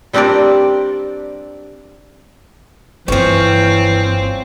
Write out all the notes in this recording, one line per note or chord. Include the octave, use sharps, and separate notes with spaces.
G3 C4 D4 G4 A#4 D5
F#1 G2 E3 F3 C4 C#4